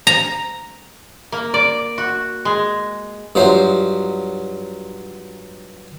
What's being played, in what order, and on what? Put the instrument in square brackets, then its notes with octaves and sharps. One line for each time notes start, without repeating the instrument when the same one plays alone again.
[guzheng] A#5
[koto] A#3
D5
F#4
G#3
[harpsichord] G2 F3 F#3 C5 E5